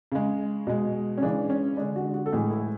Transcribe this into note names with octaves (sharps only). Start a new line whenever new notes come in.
C#3 G#3
B2 G#3
C#4
C#3 E3 G#3 D4
C#4
D3 G#3 D4
F#4
F#4
A4
A2 E3 G#3 G#4
E4